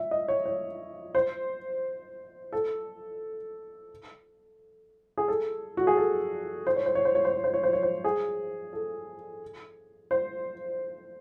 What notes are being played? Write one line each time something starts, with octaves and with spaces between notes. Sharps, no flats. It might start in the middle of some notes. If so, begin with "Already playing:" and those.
Already playing: E5
D#5
C#5
C#5
C5
A4
G#4
A4
F#4
G#4
A4
C5
C#5
C5
C#5
C5
C#5
C5
C#5
C5
C#5
C5
C#5
C5
G#4
A4
C5